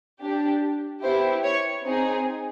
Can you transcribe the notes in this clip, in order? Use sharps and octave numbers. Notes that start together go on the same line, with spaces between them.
D4 G4
B3 E4 G4 C5
C#5
C4 D#4 G#4